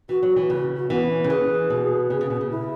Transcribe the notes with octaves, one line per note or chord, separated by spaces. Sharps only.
E3 F#4
F#3
F#4
E3
C#3 F#4
F#4
E3 B3
C#4
C#3
E3 G#4
B2
C#3 G#4
C#3
B2
C#3
E4